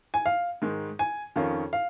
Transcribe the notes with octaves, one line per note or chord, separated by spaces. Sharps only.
G#5
F5
G#2 D#3 G#3
G#5
F2 D#3 C#4 F4
F5